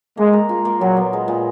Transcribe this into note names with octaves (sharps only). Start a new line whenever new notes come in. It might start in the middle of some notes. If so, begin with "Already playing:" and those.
G#3 A#3
A#4
F4
A#3
A#2 F#3
B3
G#3
A#2